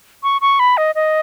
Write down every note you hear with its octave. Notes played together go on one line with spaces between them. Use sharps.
C#6
C#6
B5
D#5
D#5